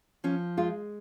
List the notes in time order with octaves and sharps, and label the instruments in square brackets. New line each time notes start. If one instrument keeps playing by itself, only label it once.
[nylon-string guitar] F3 C#4
G#3 F4